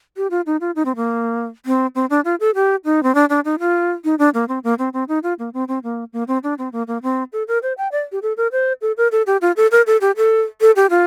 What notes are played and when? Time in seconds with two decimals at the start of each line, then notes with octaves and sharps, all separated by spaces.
0.17 G4
0.31 F4
0.46 D#4
0.61 F4
0.76 D#4
0.85 C4
0.96 A#3
1.66 C4
1.95 C4
2.10 D4
2.25 F4
2.40 A4
2.55 G4
2.85 D#4
3.03 C4
3.15 D4
3.30 D4
3.45 D#4
3.60 F4
4.04 D#4
4.19 D4
4.34 A#3
4.48 C4
4.64 A#3
4.79 C4
4.93 C4
5.08 D#4
5.23 F4
5.39 A#3
5.54 C4
5.68 C4
5.83 A#3
6.13 A#3
6.28 C4
6.44 D4
6.58 C4
6.72 A#3
6.88 A#3
7.03 C4
7.33 A4
7.48 A#4
7.63 C5
7.78 G5
7.92 D5
8.12 G4
8.22 A4
8.37 A#4
8.52 C5
8.82 A4
8.97 A#4
9.12 A4
9.27 G4
9.41 F4
9.57 A4
9.72 A#4
9.87 A4
10.01 G4
10.17 A4
10.61 A4
10.76 G4
10.90 F4